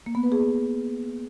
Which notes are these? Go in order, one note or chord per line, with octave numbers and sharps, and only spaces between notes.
A#3
B3
B4
G#4